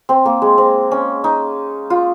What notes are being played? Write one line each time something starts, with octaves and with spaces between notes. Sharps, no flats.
C4
A#3
G#3
C4
C#4
D#4
F4